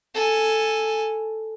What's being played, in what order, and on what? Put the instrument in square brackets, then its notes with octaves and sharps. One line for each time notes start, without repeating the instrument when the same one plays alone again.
[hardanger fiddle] A4 G#5